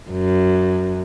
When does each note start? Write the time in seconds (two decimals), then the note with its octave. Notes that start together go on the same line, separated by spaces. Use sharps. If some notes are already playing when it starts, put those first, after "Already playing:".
0.11 F#2